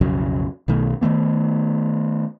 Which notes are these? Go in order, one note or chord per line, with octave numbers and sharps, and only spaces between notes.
B1 F2 C#3 F#3
B1 B2 D#3 A3
D#3 F#3 A3 B3